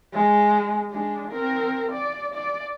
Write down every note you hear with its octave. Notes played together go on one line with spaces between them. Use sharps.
G#3
G#3 D4
C4 A#4
D5
D5